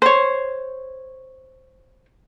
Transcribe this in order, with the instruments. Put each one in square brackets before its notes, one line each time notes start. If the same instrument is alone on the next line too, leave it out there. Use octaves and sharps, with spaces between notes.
[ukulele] C5 C#5